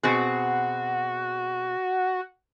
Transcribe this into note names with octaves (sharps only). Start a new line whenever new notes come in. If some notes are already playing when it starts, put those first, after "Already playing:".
B2 C4 F#4 G#4